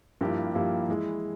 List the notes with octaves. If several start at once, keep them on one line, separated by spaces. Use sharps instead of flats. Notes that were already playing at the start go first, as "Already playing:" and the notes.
G2 F3 A#3 E4 G4
G2 F3 A#3 E4 G4
E3 G#3 E4